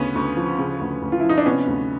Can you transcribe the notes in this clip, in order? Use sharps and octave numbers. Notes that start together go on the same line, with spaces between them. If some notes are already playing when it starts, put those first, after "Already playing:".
Already playing: D2 C#3 B3 C#4
D2
F3
C#3
D2
D2
F4
E4
F3
D#4
D4
C3 B3 C#4
D2